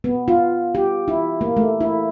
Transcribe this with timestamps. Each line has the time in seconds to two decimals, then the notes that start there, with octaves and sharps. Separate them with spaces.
0.04 B3
0.28 F4
0.75 G4
1.08 E4
1.41 A#3
1.57 A3
1.81 E4